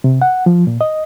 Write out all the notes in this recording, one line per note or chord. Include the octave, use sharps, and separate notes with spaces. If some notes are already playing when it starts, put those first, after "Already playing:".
C3
F#5
F3
A#2
D#5